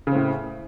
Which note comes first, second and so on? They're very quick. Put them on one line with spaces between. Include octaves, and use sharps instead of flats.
C#3 C4 A2